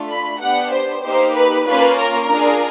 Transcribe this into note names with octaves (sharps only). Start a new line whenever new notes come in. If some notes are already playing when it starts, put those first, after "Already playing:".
Already playing: A3 D4 F4
B5
B3 D4 G4 F#5
C5
A#3 D#4 G4 C5
B4
A#3 C#4 F4 B4
A#4
D4 F4 G#4